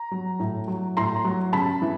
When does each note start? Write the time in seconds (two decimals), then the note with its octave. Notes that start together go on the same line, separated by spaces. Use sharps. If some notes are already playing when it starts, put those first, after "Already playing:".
Already playing: A#5
0.11 F#3
0.40 A2
0.68 F#3
0.97 A2 A#5 C6
1.25 F#3
1.53 C#3 A5 B5
1.82 E3